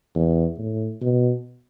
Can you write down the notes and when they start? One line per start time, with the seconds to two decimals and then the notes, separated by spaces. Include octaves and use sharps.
0.15 E2
0.58 A2
1.01 B2